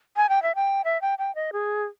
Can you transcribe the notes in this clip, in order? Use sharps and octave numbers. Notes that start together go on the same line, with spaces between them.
G#5
G5
E5
G5
E5
G5
G5
D#5
G#4